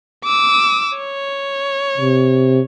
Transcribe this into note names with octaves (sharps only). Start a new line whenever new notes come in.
D6 E6
C#5
C3